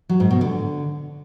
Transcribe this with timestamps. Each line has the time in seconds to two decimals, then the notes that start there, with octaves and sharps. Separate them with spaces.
0.09 F#3
0.20 G#2
0.31 B2
0.41 D3